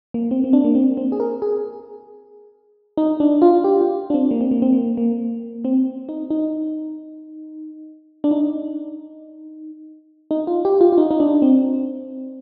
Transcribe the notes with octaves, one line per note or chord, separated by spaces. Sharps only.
A#3
C4
C4
D4
A#3
C4
C4
G#4
A#4
G#4
D#4
D4
F4
G4
F4
D4
C4
A#3
C4
A#3
C4
A#3
A#3
C4
D#4
D#4
D4
D#4
D#4
F4
G4
F4
F4
D#4
D#4
D4
C4